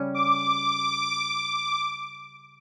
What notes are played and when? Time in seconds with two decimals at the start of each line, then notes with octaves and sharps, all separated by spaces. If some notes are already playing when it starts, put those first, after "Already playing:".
Already playing: C#3 G3 C#4
0.14 D6